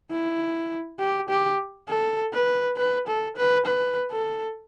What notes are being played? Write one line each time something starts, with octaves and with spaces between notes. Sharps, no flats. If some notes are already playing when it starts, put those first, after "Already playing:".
E4
G4
G4
A4
B4
B4
A4
B4
B4
A4